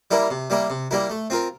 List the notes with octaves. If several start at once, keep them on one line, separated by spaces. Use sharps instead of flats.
G3 A#3 E4 A#4
C3
G3 A#3 E4 A#4
C3
G3 A#3 E4 A#4
A3
C4 F4 A#4